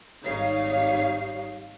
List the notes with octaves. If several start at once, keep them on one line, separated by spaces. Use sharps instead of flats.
G#1 G3 D#4 C#5 F5 C7